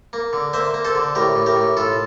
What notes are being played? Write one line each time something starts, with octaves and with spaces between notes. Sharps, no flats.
A#3
D3
A#3 C5 E5
A#3
A4 C5
D3
A2 G4 A#4
A2
G4 A#4
A2
A2 F4 A4